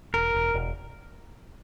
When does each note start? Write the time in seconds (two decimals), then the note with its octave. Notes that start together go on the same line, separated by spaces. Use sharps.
0.13 E1 A#4
0.34 E1
0.54 E1